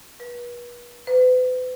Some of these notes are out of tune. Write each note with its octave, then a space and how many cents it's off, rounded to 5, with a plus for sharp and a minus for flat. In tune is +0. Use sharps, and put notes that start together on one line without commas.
B4 -40
B4 +40